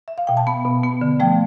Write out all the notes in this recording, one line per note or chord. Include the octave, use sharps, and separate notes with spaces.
E5
F5
B2 G5
A5
B3 B5
B2
B3
D3
F3 A3 G5